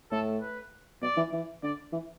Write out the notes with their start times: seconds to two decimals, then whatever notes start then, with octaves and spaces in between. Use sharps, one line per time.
0.11 A2 A4
0.41 B4
1.02 B2 D5
1.17 E3
1.32 E3
1.63 D3 D5
1.93 E3